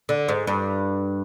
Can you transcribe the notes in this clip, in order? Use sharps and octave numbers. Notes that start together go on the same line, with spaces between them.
D3
G#2
G2